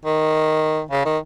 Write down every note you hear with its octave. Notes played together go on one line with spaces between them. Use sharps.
D#3
C#3
D#3